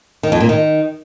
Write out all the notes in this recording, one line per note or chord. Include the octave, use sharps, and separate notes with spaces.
D#3
F2
A#2
D#3